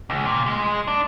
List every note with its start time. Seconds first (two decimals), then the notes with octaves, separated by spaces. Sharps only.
0.10 C#2
0.26 A#2
0.46 G#3
0.88 D4